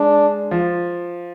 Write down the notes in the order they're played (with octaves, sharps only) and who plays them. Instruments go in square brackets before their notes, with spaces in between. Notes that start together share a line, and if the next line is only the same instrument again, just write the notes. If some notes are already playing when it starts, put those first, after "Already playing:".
Already playing: [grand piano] G#3 [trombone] D4
[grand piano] F3